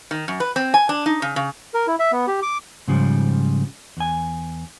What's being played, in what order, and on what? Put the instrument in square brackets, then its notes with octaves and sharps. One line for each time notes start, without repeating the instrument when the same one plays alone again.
[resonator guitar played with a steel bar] D#3
F#2
B4
C4
G#5
D4
D#4
C#3
C#3
[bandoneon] A#4
E4
E5
B3
G4
D6
[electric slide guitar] G#2 C#3 F3 G3
E2 G#5